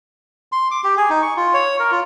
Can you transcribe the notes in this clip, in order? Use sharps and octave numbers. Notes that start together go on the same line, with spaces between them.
C6
D6
G4
G#4
D#4
C#6
F4
C#5
A#4
F4